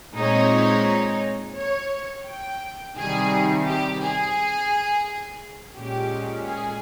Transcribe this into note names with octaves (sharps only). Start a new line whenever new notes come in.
A#2 G#3 C4 D#4 C#5
C#5
G5
C3 D#3 G3 G#4
G4
G#4
A#2 G#3 C#4 G4
G#4